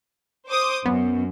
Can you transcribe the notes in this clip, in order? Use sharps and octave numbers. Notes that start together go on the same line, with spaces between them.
C5 D6 D#6
F#2 B3